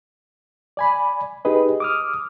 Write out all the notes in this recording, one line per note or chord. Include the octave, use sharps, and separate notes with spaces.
D5 G#5 B5
D#4 G4 G#4 B4 D#5
D6 D#6 F6